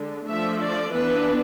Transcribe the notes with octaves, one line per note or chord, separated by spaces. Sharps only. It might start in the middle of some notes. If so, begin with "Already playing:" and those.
Already playing: D3 G#3
F3 A3 D4 E5
D5
E3 B3 D4 B4